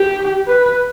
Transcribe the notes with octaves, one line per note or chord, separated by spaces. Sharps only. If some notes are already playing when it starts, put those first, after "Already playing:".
Already playing: G4
B4